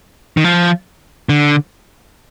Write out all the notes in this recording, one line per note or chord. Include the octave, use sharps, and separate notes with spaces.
D#3
F3
D3